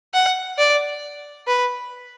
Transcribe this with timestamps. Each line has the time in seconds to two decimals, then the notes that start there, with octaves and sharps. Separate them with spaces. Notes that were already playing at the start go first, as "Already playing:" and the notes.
0.14 F#5
0.58 D5
1.47 B4